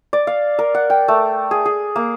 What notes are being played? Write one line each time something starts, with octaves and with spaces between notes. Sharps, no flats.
D5
F5
A#4
F#5
G5
A3
G#4
G#4
A#3